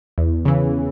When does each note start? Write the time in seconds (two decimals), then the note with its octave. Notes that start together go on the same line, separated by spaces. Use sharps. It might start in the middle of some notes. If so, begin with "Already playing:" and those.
0.18 E2
0.45 C#3 E3